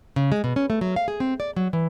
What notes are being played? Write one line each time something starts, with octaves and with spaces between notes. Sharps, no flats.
C#3
G#3
B2
C#4
A3
F#3
F5
G#4
C4
D5
F#3
E3